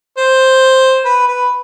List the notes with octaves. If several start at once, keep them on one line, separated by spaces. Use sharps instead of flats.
C5
B4
B4